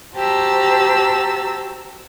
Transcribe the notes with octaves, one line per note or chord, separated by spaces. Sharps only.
F#4 G4 C5 A5 A#5 E6